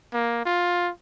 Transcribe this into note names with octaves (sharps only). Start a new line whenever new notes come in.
A#3
F4